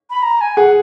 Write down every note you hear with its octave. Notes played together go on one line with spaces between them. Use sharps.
B5
A#5
G#5
G#4 F#5